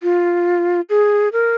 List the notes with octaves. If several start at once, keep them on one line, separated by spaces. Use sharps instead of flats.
F4
G#4
A#4